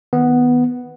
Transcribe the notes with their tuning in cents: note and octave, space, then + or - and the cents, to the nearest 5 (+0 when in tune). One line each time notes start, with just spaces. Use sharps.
D#3 +0 B3 +0